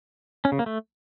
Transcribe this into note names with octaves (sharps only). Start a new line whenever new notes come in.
C#4
C#3
A#3
A3